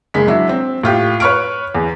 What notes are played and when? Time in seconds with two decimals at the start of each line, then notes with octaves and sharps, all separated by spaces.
0.14 F#1 G#3 B6
0.28 F#3 D4 E4
0.49 C4
0.84 A2 F4 G4
1.20 B4 C#5 C#6 F6 D7
1.75 E2